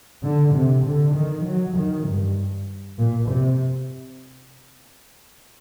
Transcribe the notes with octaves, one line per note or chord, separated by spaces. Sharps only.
D3
C3
D3
D#3
F#3
D#3
G2
A#2
C3